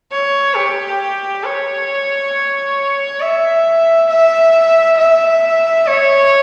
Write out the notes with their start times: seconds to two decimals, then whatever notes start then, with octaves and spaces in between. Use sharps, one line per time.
0.12 C#5
0.56 G4
1.45 C#5
3.21 E5
4.09 E5
4.98 E5
5.87 C#5